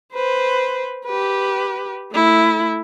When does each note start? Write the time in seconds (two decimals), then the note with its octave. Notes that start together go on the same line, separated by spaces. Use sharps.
0.14 B4 C5
1.05 G4 B4
2.12 A3 E4